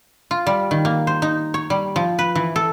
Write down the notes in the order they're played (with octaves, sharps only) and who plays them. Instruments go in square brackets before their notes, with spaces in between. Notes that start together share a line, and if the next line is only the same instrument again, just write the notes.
[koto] F4
G3
D#3
A#3
C5
D#4
C#5
G3
F3
B4
E3
A4